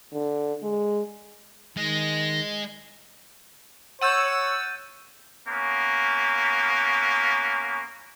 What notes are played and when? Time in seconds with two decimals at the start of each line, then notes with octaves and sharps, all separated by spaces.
0.13 D3
0.63 G#3
1.77 D#3 G#3 A#6
4.01 C#5 F#5 E6 G6 A6 D#7
5.47 A#3 B3 C#4